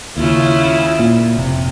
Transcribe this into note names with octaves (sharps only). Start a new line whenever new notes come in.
D#2 C#3 E4 F4
A#2
F1 C3